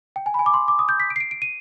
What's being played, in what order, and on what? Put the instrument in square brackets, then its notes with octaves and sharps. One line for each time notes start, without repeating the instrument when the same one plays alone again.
[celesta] G5
G#5
B5
G#5
D6
C6
D6
D#6
G6
B6
D7
C7
D7
D7
D#7